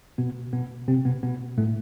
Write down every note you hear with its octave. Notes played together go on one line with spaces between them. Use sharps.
B2 B3
B2 B3
C3 C4
B2 B3
B2 B3
A2 A3